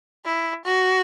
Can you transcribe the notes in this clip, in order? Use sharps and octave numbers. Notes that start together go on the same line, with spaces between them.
E4
F#4